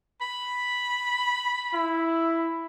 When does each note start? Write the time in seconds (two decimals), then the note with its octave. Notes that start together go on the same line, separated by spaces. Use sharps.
0.21 B5
1.74 E4